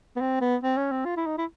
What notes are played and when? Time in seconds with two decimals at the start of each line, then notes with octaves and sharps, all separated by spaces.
0.16 B3
0.21 C4
0.41 B3
0.63 C4
0.77 C#4
0.92 C4
1.05 F4
1.17 E4
1.26 D#4
1.38 E4